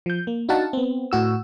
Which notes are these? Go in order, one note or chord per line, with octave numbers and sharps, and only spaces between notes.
F3 G6
A#3
D4 D#4 F#4 F5 F#5 A5
B3 C4
A2 F#4 E6